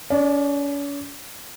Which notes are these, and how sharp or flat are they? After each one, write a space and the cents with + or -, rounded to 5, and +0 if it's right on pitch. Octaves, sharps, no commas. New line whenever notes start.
C#4 +40 D5 +15